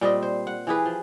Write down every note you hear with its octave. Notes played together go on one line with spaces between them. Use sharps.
A#2 G3 C4 D#5
C5
F#5
E3 G4 G#4 B4
F3